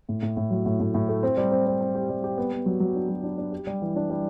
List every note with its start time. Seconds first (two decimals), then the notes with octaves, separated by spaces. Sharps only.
0.09 A2
0.22 A2
0.37 A2
0.51 F#3
0.66 A2
0.80 A2
0.94 A2
1.09 A3
1.23 C4
1.37 G3
1.52 C4
1.66 C4
1.81 C4
1.95 G4
2.09 G3
2.24 G4
2.37 B3
2.53 B3
2.66 F#3
2.80 F#3
2.95 D4
3.09 F#3
3.24 D4
3.38 D4
3.52 G4
3.67 G3
3.82 E3
3.96 D4
4.10 G3